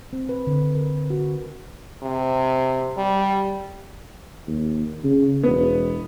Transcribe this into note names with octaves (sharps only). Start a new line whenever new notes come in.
C4
B4
D3
A#4
F#4
C3
G3
D#2
C#3
E1 B3